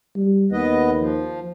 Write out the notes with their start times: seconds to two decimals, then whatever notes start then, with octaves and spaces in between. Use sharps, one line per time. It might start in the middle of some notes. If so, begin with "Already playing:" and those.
0.16 G3
0.52 D#2 B3 B4 D#5
0.98 F3